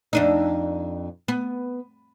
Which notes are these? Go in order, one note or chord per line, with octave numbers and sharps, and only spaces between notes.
F2 D4 D#4
B3